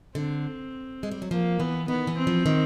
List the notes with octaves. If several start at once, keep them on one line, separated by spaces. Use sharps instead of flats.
D3 C4
G#3
G3
F#3
F3 A#3
E3 B3
D#3 B3
E3
C4
F3
D#3